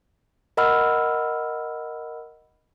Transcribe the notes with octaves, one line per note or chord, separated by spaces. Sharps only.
A#4 D#5 F#5 B5 E6 F6